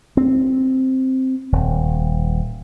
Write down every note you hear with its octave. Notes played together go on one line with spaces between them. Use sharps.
C4
D#1